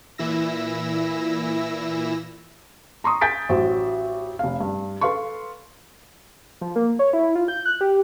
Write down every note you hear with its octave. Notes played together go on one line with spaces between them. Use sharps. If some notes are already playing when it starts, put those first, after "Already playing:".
A#2 E3 E4 E6 A#6
A#5 C6 C#6 D#6
G#5 G6 A6 B6 D7
A1 F#3 C5
F1 F5
G2
A4 B4 F5 C6 C#6
F3
A#3
C#5
E4
F4
G6
F#6
G4